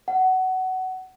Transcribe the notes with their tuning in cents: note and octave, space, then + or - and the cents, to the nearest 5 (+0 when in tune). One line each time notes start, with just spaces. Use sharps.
F#5 +20